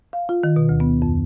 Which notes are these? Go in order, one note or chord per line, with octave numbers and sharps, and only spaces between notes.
F5
F4
D#3
B2
D2
B3
F2